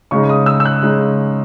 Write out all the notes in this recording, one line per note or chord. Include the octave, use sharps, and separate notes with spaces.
C#3 G#3 D#4 C#6
D#6
E6
E6
F#6
C#3 G#3 D#4